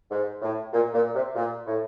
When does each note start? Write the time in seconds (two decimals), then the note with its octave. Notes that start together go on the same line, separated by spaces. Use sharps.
0.11 G#2
0.42 A2
0.73 A#2
0.93 A#2
1.14 C3
1.35 A#2
1.66 A2